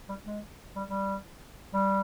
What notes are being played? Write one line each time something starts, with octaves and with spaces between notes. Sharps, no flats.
G3
G#3
G3
G3
G3